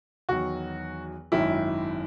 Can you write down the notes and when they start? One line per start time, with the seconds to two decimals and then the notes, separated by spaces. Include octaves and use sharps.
0.29 E2 D#3 F#3 F#4
1.32 G#1 F#2 D#3 E4